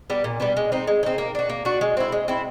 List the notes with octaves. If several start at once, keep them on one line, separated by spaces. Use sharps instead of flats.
G3 B3 D4
A#2
G3 B3 D4
G#3
C4 D#4
G#3
C4 D#4
A#3
D4 F#4
A#3
D4 F#4
G#3
C4 E4
G#3
C4 E4